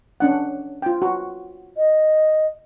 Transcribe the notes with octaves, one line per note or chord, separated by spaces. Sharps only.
C#4 D4 F#5
F4 G5
F#4
D#5